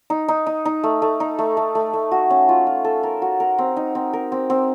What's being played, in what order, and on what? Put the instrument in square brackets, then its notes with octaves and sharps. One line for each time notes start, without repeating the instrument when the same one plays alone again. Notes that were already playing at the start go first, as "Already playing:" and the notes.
[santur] D#4
D#4
D#4
D#4
A3
A3
D#4
A3
A3
A3
A3
F#4
C#4
F4
F4
A4
A#4
F#4
A#4
C4
D#4
C4
A#4
C4
C4